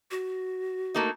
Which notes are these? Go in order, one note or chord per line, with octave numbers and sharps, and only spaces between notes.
F#4
A3 A#3 D#4